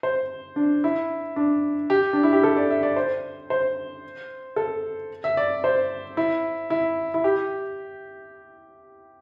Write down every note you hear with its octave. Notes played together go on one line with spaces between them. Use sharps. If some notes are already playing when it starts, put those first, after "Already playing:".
C5
D4
E4
D4
G4
D4
E4
G4
A4
D5
E5
D5
C5
C5
A4
E5
D5
C5
E4
E4
E4
G4